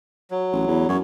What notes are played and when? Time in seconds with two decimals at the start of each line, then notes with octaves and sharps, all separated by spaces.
0.31 F#3
0.52 A1
0.68 E2
0.89 F#2 C#5